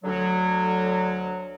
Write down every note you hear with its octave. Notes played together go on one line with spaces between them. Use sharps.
D2 D3 F#3